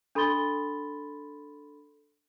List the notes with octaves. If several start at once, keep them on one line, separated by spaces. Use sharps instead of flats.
D4 A4 B5 C6 A6 G7